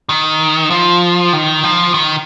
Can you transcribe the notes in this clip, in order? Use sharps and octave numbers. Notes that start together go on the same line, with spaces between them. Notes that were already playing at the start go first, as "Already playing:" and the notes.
D#3
F3
D#3
F3
D#3